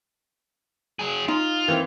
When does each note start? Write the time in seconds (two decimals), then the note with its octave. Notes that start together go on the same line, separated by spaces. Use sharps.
0.99 F#3 G#4
1.28 D#4 F4
1.68 E3 A#3 C4